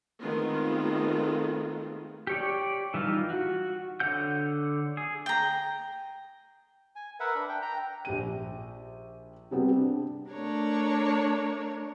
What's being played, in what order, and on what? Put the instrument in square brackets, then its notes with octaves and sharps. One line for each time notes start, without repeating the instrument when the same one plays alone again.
[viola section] D#3 G#3 A3 B3 C4 F4
[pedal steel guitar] G4 C#5 D5
E3 G3 D#4 F4
F#4
D3 C#5 F#5 G6
G#4
[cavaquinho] G5 A#5
[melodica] G#5
A#4 B4 E5 F#5
D4 B5
G5
G5 A#5
[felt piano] A#1 G4 D#7
C3 G3 B3 C4
D4
[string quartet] A3 D4 A#4 C#5